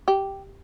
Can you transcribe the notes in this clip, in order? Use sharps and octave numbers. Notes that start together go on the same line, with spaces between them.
G4